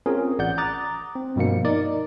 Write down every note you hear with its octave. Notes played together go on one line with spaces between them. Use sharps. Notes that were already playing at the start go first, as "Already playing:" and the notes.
C4 C#4 F4 G#4 A#4
A1 D5 F#5 G6
A#5 D6 D#6 F#6 A6
C4
G2 B2 F3 A#3 C#7
D#4 A#4 D5 D#5